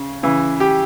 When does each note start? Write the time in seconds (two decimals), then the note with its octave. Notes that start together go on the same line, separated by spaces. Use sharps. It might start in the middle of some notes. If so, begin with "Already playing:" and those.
Already playing: C#3
0.23 C#3 E3
0.60 G4